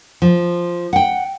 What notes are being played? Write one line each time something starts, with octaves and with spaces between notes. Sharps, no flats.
F3
F#5 G5